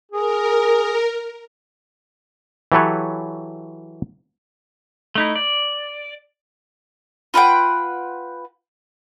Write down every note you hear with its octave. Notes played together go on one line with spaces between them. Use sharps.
G#4 A#4
E3 F#3 G4 A4 B4 C#5
A3 D#4 E4
D5
F4 B4 F#5 G5